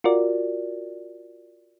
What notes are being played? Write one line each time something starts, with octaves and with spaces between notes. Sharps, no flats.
F4 F#4 A#4 D5